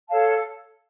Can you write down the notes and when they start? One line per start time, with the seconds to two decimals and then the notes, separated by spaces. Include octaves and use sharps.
0.09 A4 C#5 F5 A5